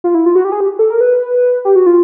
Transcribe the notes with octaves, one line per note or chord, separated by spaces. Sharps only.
F4
E4
F4
F#4
G4
G#4
G4
A4
A#4
B4
G4
F#4
F4